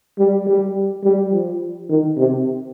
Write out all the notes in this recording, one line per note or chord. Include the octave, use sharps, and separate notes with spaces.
G3
G3
G3
F3
D#3
C3